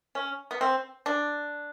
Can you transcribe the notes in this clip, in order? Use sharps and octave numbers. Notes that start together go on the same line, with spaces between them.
C#4
B3
C4
D4